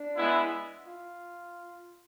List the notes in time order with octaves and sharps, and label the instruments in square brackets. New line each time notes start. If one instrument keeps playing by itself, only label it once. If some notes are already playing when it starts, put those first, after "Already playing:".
Already playing: [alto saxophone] D4
[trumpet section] G#3 B3 E4
[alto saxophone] F4